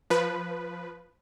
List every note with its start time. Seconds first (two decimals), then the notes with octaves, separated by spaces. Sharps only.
0.10 F3 B4